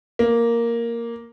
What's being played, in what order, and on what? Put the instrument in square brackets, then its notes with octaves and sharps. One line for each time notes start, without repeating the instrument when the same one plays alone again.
[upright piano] A#3